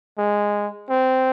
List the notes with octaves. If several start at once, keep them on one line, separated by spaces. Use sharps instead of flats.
G#3
C4